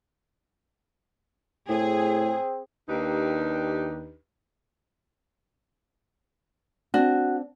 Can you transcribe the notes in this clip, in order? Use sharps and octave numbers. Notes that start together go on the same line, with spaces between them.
A2 C4 G#4
D#2 D4 D#4 G4 B4
C4 D4 F#4